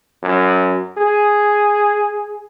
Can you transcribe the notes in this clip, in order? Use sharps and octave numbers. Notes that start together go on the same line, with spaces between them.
F#2
G#4